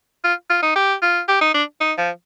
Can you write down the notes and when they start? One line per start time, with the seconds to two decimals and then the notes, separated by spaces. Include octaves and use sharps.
0.24 F4
0.50 F4
0.63 D#4
0.76 G4
1.02 F4
1.28 G4
1.42 D#4
1.54 D4
1.81 D#4
1.98 F3